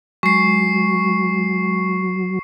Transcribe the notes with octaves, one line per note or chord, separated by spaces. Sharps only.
F#3 G#3 C#6 C7